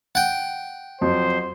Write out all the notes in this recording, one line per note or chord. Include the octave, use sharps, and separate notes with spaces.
F#5 G5
F2 F#3 C5